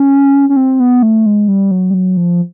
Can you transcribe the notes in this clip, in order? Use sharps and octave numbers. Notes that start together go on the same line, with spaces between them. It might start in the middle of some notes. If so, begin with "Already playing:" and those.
Already playing: C#4
C#4
C4
B3
A3
G#3
G3
F#3
G3
F#3
F3